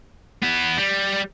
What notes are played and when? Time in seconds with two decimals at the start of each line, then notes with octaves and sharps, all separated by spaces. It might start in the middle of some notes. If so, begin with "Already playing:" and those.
0.42 B3 E4
0.77 G3